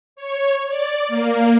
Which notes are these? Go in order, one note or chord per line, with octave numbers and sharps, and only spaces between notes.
C#5
D5
A#3